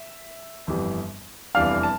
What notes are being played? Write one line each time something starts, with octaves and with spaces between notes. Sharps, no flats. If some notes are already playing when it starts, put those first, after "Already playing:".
Already playing: E5
G1 F2 E3 G3
F1 E2 E3 G3 D4 F5 F6
A5